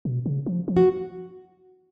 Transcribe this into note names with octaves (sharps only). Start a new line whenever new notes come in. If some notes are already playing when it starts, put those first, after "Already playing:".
B2
C#3
F3
F3
F#4